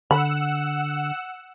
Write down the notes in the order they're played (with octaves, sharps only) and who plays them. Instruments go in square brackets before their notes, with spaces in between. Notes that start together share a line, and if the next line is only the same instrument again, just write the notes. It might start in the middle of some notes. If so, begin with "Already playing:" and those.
[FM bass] D3 [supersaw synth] F#5 E6 [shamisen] B5